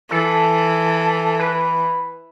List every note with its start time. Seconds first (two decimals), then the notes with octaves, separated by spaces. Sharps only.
0.11 E3 A4
1.39 B4